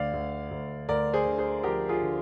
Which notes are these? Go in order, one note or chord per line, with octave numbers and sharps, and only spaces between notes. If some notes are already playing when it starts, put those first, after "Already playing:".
Already playing: D2 D3 D5 F5
D2
D2
D2 A#4 D5
G#4 C5
D3
G#4 C5
F3 G4 A#4
F4 G#4
D3